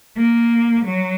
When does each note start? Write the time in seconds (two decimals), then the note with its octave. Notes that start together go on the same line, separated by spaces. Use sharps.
0.17 A#3
0.84 F#3